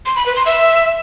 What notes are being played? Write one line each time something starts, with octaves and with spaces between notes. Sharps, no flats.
C6
B5
B4
C6
E5